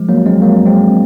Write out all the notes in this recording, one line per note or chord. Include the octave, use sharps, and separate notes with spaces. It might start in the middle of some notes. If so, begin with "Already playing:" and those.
Already playing: F3 G#3
F#3 A#3
G#3 C4
F#3 A#3
G#3 C4